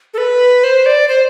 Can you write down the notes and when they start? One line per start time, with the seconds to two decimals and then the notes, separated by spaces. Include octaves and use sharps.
0.14 A4
0.18 B4
0.64 C5
0.86 D5
1.08 C5